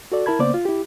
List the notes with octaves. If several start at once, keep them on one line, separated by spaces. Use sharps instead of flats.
F#4 A4 D5
E4 A#4 A5 B5 G#6
C#3 A#3 B3 C5 D5 D6
F4
E4 G4